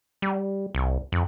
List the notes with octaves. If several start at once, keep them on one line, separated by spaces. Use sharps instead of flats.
G3
C2
F2